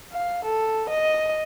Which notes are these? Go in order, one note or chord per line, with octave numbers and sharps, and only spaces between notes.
F5
A4
D#5